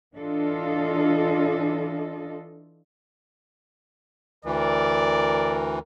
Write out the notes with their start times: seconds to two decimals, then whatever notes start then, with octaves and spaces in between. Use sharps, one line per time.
0.15 E3 D4 F4 A4 D#5
4.45 D2 E3 A#4 D5